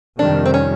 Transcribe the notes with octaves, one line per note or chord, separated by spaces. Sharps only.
F2 C3 D#3 G3 D4
C4
C#4